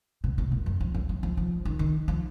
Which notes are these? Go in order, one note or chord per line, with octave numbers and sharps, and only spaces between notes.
B2
B2
A#2
F#2
F3
F#3
F#3
F3
F3
D#3
D#3
F3